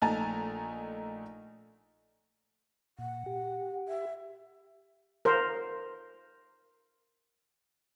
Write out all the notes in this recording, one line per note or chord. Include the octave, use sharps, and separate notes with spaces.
A#1 A3 D#4 G#5 A#5 A6
A#2 F#5
G4
E5
A#4 C5